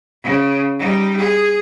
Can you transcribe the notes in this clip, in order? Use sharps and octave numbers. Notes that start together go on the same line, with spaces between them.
C#3
G3 D#4
G#4